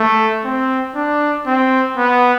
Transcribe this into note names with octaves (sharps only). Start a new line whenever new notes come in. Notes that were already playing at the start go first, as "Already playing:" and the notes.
Already playing: A3
C4
D4
C4
B3